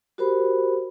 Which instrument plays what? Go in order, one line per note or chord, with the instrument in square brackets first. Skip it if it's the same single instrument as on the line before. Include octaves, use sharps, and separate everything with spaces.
[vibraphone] F#4 G4 A#4 C5 B5